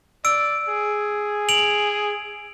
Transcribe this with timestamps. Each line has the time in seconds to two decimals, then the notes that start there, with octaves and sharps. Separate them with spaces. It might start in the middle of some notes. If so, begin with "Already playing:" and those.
0.25 D5 E6 D7
0.69 G#4
1.49 D7 F7 F#7